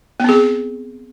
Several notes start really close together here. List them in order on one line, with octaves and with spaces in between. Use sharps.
B3 C4 G#4